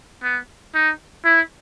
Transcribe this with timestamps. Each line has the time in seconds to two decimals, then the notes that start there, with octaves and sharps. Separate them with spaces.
0.23 B3
0.75 D#4
1.25 E4